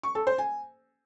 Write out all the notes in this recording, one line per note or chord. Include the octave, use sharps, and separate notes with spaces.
C#6
A4
C5
G#5